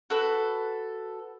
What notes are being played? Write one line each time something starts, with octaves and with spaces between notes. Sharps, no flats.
F#4 A4 B4